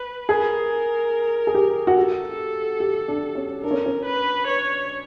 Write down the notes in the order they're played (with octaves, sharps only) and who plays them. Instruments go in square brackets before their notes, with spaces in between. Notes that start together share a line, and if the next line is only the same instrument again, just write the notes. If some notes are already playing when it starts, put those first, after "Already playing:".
Already playing: [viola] B4
[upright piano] G#4 [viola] A#4
[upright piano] G#4
G4
F#4
[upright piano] G4 [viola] A4
[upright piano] G4
D4
C#4
[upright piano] D4 [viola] A#4
[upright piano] C#4
C#4
[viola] B4
C#5